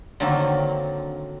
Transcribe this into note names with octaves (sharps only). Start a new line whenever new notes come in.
D3 D#3 F#3 A#3 C4